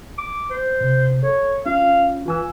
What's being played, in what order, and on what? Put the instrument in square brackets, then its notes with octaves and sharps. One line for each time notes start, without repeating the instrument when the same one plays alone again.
[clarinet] D6
C5
[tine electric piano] C3
[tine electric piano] A4 [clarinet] C#5
[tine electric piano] C#4 F4 [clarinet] F5
[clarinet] E3 [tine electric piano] F4 G#5 E6